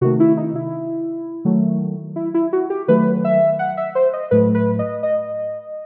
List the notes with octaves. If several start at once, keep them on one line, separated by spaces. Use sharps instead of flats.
C3 D#3 A3 F#4
E4
D#4
E4
D#3 F#3 A3
E4
E4
F#4
G4
D#3 F#3 A3 B4
E5
F#5
E5
C5
D#5
A2 F#3 A3 B4
B4
D#5
D#5